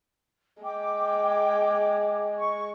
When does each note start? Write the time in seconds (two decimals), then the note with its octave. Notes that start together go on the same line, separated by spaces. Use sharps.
0.63 G#3 G5 D6
2.37 C#6